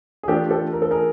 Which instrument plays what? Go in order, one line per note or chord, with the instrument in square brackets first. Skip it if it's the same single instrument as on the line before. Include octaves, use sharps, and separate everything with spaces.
[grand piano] G#4
[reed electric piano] E3 A3 D4 F4 [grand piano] G4 A4
[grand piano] G4 A4
A#4
A4
G#4 A#4